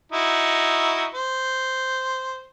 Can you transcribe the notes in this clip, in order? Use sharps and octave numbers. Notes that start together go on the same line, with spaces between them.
D#4 E4 F#4
C5